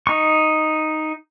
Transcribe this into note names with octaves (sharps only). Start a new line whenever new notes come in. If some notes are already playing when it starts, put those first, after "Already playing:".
D#4 C#6